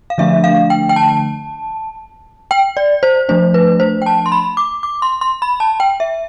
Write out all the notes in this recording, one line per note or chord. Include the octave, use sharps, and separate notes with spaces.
F5
D3 F3 A3 D4 E5
F5
G5
G5
A5
G5
D5
C5
F3 A3 D4 C5
B4
C5
G5
A5
C6
B5
D6
D6
C6
C6
B5
A5
G5
E5